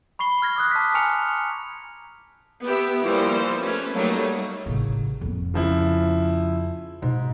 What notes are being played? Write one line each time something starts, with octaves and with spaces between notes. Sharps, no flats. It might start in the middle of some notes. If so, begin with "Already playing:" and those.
B5 C#6 C7 G7
F6 G#6 A#6
D6 D#6 F#6
A5 C6 D6 F#6 B6
G#5 A#5 C#6 F6 C#7 F7
B3 G4 E5
E3 F3 G3 A#3 C5
A3 C#4 B4
F#3 G3 A3 A#3 D#4
A1 C#3
F2 B3
C#3 F3 E4
G#2 B2